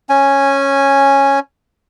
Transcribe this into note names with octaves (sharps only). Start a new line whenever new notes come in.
C#4 G#5